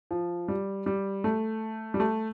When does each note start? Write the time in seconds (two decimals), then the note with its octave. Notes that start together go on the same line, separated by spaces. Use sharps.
0.11 F3
0.48 G3
0.86 G3
1.24 A3
1.94 G3
2.00 A3